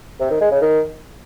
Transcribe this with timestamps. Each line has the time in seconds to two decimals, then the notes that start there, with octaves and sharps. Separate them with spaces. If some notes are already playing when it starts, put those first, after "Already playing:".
0.20 C3
0.31 D#3
0.41 G#3
0.51 C#3
0.61 D#3